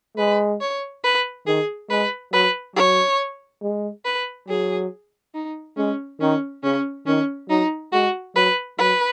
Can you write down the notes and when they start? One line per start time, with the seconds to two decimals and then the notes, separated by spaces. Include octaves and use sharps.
0.17 G#3 B4
0.61 C#5
1.04 B4
1.47 D#3 G#4
1.90 G#3 B4
2.33 F#3 B4
2.76 F#3 C#5
3.62 G#3
4.05 B4
4.48 F#3 G#4
5.34 D#4
5.77 G#3 C#4
6.20 D#3 C#4
6.63 C#3 C#4
7.06 D#3 C#4
7.49 F#3 D#4
7.92 G#3 F#4
8.36 F#3 B4
8.78 F#3 B4